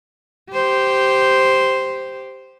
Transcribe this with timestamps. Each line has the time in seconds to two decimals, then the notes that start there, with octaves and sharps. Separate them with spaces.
0.52 G4 C5